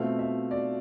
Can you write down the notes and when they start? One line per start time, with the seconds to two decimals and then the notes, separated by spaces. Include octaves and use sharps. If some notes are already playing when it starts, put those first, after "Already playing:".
Already playing: B2 A3 C4 F4 F5
0.19 E5
0.51 D5